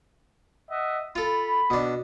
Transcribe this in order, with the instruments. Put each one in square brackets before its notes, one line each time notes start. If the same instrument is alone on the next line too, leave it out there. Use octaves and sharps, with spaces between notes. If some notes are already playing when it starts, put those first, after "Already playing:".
[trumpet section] D#5 E5 F#5
[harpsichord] F4 A4 [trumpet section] B5
[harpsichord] B2 D4